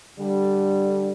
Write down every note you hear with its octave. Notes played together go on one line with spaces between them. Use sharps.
D3 G3